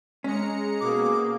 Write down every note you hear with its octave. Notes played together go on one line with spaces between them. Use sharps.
G#3 C#4 A#5 C#7
B2 A#3 G#4 D6